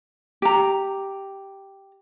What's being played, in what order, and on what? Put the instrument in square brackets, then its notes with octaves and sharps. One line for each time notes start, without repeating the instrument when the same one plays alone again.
[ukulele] G4 A#5